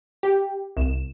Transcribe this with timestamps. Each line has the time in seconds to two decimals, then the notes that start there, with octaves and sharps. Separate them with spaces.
0.23 G4
0.77 C2 E7